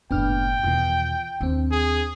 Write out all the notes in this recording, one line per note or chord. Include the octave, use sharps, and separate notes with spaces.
F#1 A2 B3 D4 G5 F6
E2 B2 D#3 F4
D#2 C4 D4
G#4